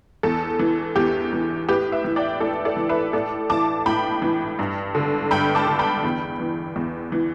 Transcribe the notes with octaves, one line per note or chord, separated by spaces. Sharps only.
E2 A4
E3
E2 G4
E3
A2 G4 B4
B4 E5
E3
D5 G5
A2 A4 D5
A4 D5
E3
B4 E5
A2 A4 D5
E3 A5 D6
A2 G5 B5
E3
G2
D3
G2 G5 B5
A5 D6
D3
G5 B5
E2
E3
E2
E3